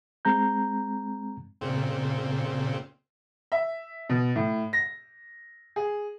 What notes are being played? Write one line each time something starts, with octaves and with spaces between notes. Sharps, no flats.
G#3 C4 A#5 G6
A#2 C#3 C4
E5
B2
A2
A#6
G#4